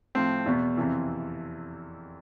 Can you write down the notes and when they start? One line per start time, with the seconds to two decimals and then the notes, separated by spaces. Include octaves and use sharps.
0.15 A2 F3 C4
0.46 E2 B2
0.77 F2 C3 E3